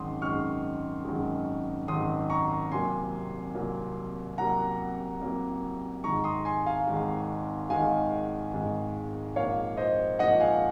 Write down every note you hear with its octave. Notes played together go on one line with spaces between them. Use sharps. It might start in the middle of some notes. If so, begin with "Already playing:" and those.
Already playing: G#1 F#2 D#3 G#3 C6 D#6
G#1 F#2 D#3 G#3 C#6 F6
G#1 F#2 D#3 G#3
G#1 F#2 D#3 G#3 C6 D#6
A#5 C#6
C2 C3 F#3 A#3 G#5 C6
C2 C3 F#3 A#3
C2 C3 F#3 A#3 F#5 A#5
C2 C3 F#3 A#3
G#1 G#2 D#3 G#3 A#5 C#6
C6 D#6
G#5 C6
F5 G#5
G#1 G#2 D#3 G#3
G#1 G#2 D#3 G#3 F5 G#5
G#1 G#2 D#3 G#3
A#1 G#2 F3 A#3 C#5 F5
C5 D#5
A#1 G#2 F3 A#3 D#5 F#5
F5 G#5